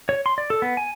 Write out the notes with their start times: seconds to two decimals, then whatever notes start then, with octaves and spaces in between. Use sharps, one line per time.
0.09 C#5
0.26 C6
0.38 D5
0.50 A4
0.62 B3
0.77 G#5